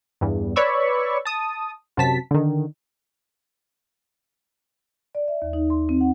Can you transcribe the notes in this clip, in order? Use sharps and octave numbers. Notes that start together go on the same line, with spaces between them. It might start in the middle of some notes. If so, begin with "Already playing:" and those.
E2 G2
B4 C#5 D5 B5 C#6 E6
A5 D#6
F#2 C3 A5 B6
D3 D#3
D5
E5
D#2
D#4
C6
C4
F#5